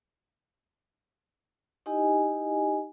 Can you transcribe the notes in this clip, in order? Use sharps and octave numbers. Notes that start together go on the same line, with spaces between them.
D#4 E4 G4 D#5 G#5